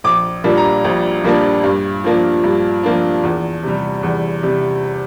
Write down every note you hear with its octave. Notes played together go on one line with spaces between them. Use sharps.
A#1 D6
A#2 G3 A#3 D4
A#5
A#1
A#2 G3 A#3 D4
G2
F3 A#3 D4
G2
F3 A#3 D4
E2
C3 G3
E2
C3 G3